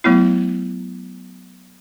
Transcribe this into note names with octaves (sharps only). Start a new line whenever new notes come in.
F#3 A3 B3 E4